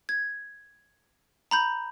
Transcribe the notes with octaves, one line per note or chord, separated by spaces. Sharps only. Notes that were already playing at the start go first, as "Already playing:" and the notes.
G#6
A#5 B5 G6